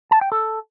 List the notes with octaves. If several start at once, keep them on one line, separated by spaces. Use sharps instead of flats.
A5
G5
A4